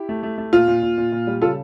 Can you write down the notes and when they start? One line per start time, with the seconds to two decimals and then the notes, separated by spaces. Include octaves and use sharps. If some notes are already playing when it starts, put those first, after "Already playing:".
Already playing: E4 G4
0.09 A3
0.23 A3
0.38 A3
0.53 A#2 F4
0.68 A#2
0.83 A#2
0.98 A#2
1.12 A#2
1.27 G3
1.42 C#3 F4 A4